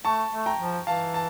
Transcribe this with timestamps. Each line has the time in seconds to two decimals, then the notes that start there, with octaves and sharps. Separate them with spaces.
0.05 A3 A5 C#6
0.32 A3
0.46 G5 A#5
0.60 F3
0.87 E3 F5 A5
1.14 A5